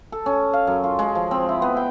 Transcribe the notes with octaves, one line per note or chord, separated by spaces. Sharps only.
A4
C#4
F5
F#2
F4
G#3
F3
C4
E4
B3
G5